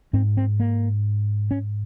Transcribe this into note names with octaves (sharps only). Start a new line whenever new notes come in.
G#2 C4
C4
A#3
C#4